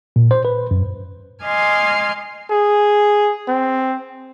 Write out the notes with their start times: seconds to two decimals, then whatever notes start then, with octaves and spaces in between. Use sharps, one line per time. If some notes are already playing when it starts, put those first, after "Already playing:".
0.16 A#2
0.31 C5
0.45 B4
0.71 F#2
1.43 D#5 G#5 C6 D6 F6 G#6
2.51 G#4
3.48 C4